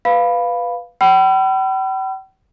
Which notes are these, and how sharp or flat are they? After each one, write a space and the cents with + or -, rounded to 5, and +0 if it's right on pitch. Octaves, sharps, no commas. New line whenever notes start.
B4 +0 F5 +0 B5 +0
G5 -45 B5 +15 E6 +45